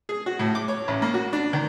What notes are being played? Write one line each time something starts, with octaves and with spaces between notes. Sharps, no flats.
G#4
F#4
A2
D6
C#5
A1
A#3
F#4
D4
D#3